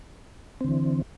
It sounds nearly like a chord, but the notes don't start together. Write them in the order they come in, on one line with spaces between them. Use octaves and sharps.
C4 D3 E3